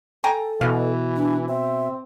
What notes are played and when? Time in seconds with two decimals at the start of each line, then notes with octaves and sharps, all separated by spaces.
0.24 A4 G5 G#5 A#5
0.61 B2 E3 F5
1.16 D4
1.48 C4 E5